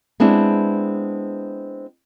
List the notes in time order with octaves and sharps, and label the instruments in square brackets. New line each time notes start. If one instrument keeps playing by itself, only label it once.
[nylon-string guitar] G#3 B3 C4 D4 E4